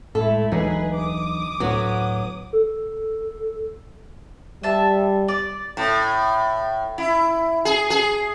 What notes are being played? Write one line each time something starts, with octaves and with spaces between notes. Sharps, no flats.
A2 G#3 A3 E4 A4
D2 E3 F#3 D#4 G#4 B4
D6 D#6
D2 A2 F#3 B3 F#4
A4
G3 E5 A5
D5
A2
E4
G#4
G#4